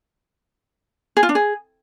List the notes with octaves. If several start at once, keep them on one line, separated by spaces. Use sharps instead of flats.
G#4
F4
D4
G#4